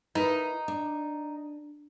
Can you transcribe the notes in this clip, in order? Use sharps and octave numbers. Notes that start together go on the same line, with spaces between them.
D#4 E4 A#4 B4
D4